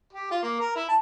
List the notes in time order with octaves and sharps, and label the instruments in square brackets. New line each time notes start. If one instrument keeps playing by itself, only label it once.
[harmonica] G4
F4
A#3
A#4
E4
A5